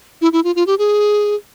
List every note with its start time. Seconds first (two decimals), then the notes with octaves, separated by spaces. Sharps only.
0.21 E4
0.33 E4
0.44 F4
0.55 F4
0.67 G4
0.79 G#4